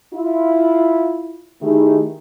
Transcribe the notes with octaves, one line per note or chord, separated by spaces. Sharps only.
E4 F4
D#3 A3 D#4 E4 G4 G#4